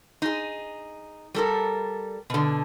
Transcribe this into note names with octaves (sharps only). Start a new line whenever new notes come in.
D#4 G#4
G3 A4 A#4
B2 D3